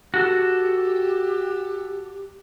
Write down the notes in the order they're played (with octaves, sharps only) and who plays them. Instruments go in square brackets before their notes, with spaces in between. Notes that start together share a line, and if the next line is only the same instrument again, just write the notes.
[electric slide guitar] F#4 A4 [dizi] G4